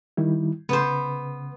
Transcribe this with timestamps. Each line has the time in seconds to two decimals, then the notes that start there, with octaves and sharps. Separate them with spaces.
0.17 D#3 G3 E4
0.69 C#3 B3 B4 C5